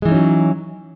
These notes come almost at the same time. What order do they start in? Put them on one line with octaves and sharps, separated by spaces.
G#3 E3 D#4 C#4 F#3